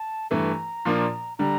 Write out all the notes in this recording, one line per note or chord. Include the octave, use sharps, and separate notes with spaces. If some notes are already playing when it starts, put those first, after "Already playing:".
Already playing: A5
G2 E3 A3 A#5
A#2 F3 A#3 D4
D3 G3 A#5